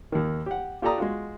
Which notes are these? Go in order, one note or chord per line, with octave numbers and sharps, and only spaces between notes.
D#2 D#3
G4 F#5
F4 G4 A4 D5 A#5 D#6
G#3 F4 F#4